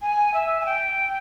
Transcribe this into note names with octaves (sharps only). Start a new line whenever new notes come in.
G#5
E5
G#5
G5